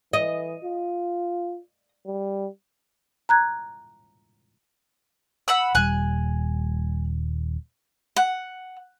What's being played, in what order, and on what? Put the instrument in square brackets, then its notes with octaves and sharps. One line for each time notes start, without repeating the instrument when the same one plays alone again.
[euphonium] E3 [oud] D#5
[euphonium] F4
G3
[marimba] A#5 F#6 G#6
[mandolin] F#5 B5 E6
[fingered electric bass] D#1 G3 [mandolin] G#5 F#6
[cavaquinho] F#5